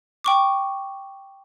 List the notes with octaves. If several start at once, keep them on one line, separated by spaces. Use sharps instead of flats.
G5 C#6 D6